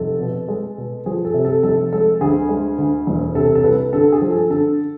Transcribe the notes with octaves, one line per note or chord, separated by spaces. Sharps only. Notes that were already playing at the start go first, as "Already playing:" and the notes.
Already playing: F1 A4
B2
G#3
B2
F3 G#4
A4
C3
A4
F1 A4
G#3 A4
D2 G#4
G#3
D2
E1
C3 A4
A4
C2 B4
D3 A4
G#4
F3
A4
D3 A4